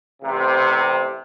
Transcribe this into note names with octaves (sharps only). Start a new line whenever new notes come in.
A1 C3